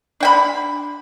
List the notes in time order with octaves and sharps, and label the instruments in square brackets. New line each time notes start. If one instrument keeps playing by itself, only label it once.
[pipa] D4 G5 B5